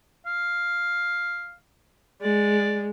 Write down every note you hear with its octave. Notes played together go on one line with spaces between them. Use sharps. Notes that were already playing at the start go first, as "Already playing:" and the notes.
F5
G#3 D5